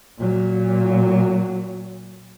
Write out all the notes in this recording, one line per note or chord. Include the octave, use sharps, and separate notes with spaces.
A#2 F#3